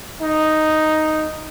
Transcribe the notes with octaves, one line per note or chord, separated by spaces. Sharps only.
D#4